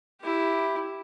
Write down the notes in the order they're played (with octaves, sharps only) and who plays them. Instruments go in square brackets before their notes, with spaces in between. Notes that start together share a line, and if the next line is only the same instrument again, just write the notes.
[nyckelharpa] E4 G4